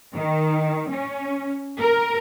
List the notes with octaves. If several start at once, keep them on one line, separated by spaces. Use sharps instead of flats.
D#3
C#4
A#4